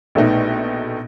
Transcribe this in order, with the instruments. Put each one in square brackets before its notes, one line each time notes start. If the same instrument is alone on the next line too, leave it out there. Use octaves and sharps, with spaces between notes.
[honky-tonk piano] A#1 B2 A3 B3 D#4